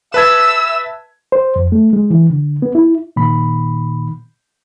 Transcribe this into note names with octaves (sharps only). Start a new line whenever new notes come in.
B4 E5 A5 E6 G#6
C5
F2
A3
G#3
E3
D3
B3
E4
A#2 D#3 B5